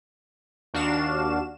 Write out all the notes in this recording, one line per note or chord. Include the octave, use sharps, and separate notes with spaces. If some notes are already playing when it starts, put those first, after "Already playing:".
D#2 D4 F#4 F5 E7